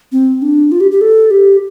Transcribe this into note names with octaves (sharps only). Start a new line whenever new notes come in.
C4
D4
F4
G4
G4
A4
G4